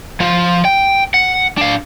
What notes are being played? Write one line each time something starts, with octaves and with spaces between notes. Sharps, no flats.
F3 F4
G5
F#5
D4 F5